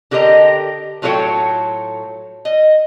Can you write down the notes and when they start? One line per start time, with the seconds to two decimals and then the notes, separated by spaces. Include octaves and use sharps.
0.11 D3 F#4 G4 A#4 D#5 A#5
1.02 A2 F#3 F4 A4 C#5 G5
2.45 D#5